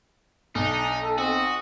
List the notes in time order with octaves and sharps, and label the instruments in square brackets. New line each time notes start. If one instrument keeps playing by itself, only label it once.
[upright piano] B1 [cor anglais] D4 [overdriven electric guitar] D#4
[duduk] A4
[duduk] C4 [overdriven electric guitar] F#4 [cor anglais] D#5